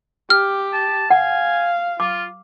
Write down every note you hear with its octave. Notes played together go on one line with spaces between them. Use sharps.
G4 F6
A5
F5 F#5 G#5
F4 D6